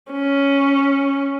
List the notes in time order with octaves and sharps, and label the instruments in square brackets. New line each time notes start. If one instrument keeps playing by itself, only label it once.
[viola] C#4